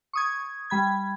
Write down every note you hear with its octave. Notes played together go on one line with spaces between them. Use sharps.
C#6 D#6 G#6
G3 B5 G#6